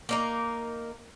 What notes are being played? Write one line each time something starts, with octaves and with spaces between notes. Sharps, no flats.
A#3 D#4 A#4